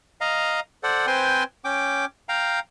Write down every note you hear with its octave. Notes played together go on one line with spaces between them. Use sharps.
D#5 F5 A#5
A4 C5 D5 F#5
C4 B4 C5 G5 G#5 C6
C#4 G5 D6
F5 G5 A#5